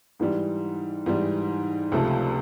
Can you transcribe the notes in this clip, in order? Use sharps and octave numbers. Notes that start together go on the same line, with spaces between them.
G#2 E3 G3
G#2 E3 G3
C#2 C3 F3 A3